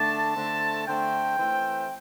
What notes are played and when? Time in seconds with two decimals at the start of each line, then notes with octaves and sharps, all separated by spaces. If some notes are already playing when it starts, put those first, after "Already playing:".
Already playing: D3 A3 D4 A5
0.36 D3 A3 C4
0.87 D3 A3 C4 G5
1.39 E3 A3 C4